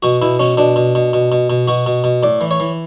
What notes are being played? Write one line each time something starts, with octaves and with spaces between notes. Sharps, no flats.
B2 F#4
B2 E4
B2 C#4
B2 D4
B2
B2
B2
B2
B2
B2 F#4
B2
B2
A2 D5
E3
C#5
E3